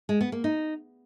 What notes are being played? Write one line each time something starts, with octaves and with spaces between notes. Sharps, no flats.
G#3
B3
A#3
D#4